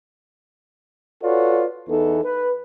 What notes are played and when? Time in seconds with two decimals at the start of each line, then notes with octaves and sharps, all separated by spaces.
1.23 F4 F#4 A4 B4 C#5 D5
1.89 E2 E3 B3 D#4 A4
2.25 B4